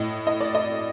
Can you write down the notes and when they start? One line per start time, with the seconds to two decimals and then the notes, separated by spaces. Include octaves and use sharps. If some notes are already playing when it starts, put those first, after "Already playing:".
Already playing: A2 D#5
0.27 D#5
0.41 D5
0.55 D#5